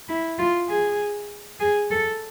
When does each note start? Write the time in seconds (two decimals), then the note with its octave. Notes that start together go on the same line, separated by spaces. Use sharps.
0.09 E4
0.38 F4
0.69 G#4
1.60 G#4
1.91 A4